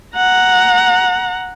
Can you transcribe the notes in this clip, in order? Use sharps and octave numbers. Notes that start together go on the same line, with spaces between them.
F#5 A#5